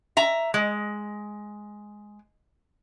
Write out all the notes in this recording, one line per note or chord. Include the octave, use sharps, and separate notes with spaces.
E5 A#5
G#3